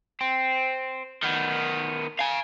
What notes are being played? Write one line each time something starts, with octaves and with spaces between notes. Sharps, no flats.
C4
D#3 B3
F5 G#5